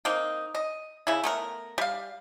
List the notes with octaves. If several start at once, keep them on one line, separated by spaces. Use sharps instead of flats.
A#3 C4 D#4
D#5
C#3 E4
A3 B3 A#4
G3 F5